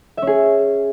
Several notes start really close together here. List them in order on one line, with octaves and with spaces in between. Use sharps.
E5 C#4 G#4